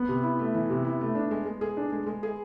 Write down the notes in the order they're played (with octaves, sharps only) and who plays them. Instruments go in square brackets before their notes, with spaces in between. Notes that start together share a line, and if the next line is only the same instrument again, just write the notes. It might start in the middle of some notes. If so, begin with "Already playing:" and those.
Already playing: [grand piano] B3
[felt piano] C3
E4
A3
E3
C3
E4
A3
D4
G#3
G#3
G#4
D4
G#3
G#3
G#4